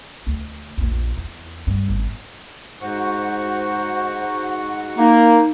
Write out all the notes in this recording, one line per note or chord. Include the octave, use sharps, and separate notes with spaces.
D2
A#1 E2
E2
G2
G#1 B3
G#2 F#4 C5 C#6
A#3 D#4